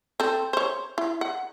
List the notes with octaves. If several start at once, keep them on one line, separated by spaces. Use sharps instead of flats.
C4 A4
C5 C#5
E4
F#5